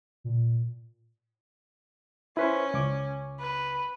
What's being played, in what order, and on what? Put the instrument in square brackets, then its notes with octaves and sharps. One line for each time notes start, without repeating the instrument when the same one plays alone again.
[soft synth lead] A#2
[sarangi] C#4 [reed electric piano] E4 B4 C5
[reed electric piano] C#2 D6
[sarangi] B4